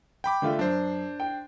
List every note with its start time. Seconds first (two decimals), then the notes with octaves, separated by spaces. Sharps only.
0.24 G5 B5 D6
0.42 D3 A3 F4
0.59 F#2 D4 C5
1.20 G5